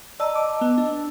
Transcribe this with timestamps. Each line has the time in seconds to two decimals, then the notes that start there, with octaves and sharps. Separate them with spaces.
0.20 D5 D#5 A5 A#5 E6
0.35 D6
0.61 B3
0.78 D4